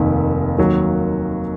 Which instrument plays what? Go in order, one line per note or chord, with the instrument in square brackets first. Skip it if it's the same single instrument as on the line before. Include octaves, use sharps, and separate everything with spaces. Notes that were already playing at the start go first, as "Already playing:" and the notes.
Already playing: [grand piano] F1 D#2 D#3
D#2 D#3 F#3